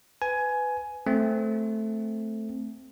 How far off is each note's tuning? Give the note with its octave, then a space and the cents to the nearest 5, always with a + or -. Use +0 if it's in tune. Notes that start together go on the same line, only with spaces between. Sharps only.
B4 +20 G#5 +15
A3 +0 C4 +0